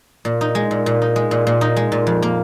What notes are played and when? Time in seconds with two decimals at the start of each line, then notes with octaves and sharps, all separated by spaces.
0.25 A#2
0.41 D#4
0.55 G#3
0.71 A#2
0.86 A#2
1.02 D#4
1.16 G#3
1.31 A#2
1.47 A#2
1.61 D#4
1.76 G#3
1.92 A#2
2.07 F2
2.23 A#3